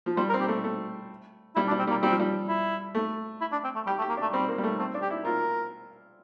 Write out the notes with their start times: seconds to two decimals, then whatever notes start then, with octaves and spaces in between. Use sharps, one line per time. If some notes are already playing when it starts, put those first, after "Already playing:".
0.06 F3
0.17 G3 C5
0.29 A#4
0.34 C4
0.41 G4
0.48 A3
0.64 A3
1.56 G3 E4
1.67 D4
1.71 G3
1.79 C4
1.87 G3 A#3
2.02 G3 C4
2.11 F3
2.20 G3
2.49 E4
2.95 A3
3.41 E4
3.52 D4
3.64 C4
3.75 A3
3.86 G3 G4
3.98 A3
4.02 G4
4.09 A#3
4.17 A3 D4
4.32 G3 C4
4.48 A#3
4.58 G3
4.63 A3
4.78 A3 C4
4.94 D4
5.02 G4
5.10 E4
5.25 F4 A#4